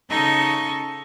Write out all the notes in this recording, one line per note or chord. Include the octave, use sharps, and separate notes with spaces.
C#3 D#4 A4 D#5 C#6